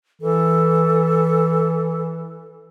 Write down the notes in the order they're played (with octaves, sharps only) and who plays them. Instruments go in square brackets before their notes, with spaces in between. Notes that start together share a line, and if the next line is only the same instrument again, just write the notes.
[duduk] E3 [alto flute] A4